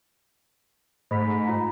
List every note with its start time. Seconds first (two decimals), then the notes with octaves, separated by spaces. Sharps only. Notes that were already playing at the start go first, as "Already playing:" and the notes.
1.11 G#2 A3 B5 B6
1.47 F4 A#5